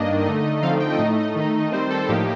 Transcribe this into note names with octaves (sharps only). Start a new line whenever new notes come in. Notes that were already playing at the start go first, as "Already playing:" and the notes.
Already playing: G2 D#3 A#3 D4 D#5
D3 A3 D#4
D3 F3 A3 C4 D#4 F5
G5
D#5
A2 A3 D#4
D#3 A3 D#4
D#3 G3 C4 C5
A4
A2 F3 A#3 D#4 G4